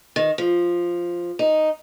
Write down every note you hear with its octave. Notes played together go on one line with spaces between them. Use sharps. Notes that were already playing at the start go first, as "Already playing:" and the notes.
D#3
F3
D#4